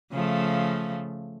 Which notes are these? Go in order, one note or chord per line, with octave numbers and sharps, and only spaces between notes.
C#3 F3 A3